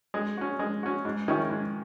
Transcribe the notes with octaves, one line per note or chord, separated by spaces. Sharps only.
G#3
C#4 F#4
G#3
C#4 F#4
G#2
D#3 G#3 C#4 E4
G#2